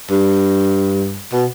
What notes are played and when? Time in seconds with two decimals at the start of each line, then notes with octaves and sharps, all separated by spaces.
0.10 G2
1.32 B2